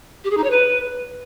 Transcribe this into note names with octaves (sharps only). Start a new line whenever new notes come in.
G4
G#4
D#4
C#5
B4